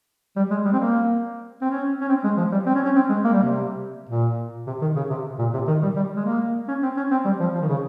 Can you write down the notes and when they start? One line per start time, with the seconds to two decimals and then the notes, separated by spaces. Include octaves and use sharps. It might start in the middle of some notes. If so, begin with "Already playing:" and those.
0.36 G3
0.51 G#3
0.65 G3
0.73 C4
0.79 A#3
1.61 C4
1.70 C#4
2.01 C#4
2.09 C4
2.24 G#3
2.37 F3
2.52 G3
2.66 C4
2.75 C#4
2.85 C#4
2.95 C4
3.09 G#3
3.24 A#3
3.33 G3
3.43 C3
4.09 A#2
4.67 C3
4.81 D#3
4.96 C#3
5.10 C3
5.39 A#2
5.53 C3
5.68 D#3
5.82 G3
5.96 G3
6.16 G#3
6.25 A#3
6.68 C#4
6.83 C4
6.97 C#4
7.11 C4
7.25 G3
7.40 F3
7.54 F3
7.61 D#3
7.68 C#3